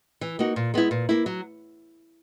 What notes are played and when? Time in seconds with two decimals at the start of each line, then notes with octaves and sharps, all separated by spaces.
0.21 E3
0.39 A#3 D#4 F#4
0.56 A#2
0.74 G#3 B3 E4
0.91 A#2
1.09 A#3 E4
1.26 F#3